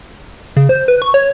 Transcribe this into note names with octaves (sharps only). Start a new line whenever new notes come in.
C#3
C5
B4
C#6
C#5